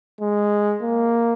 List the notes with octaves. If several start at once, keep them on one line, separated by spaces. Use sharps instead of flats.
G#3
A#3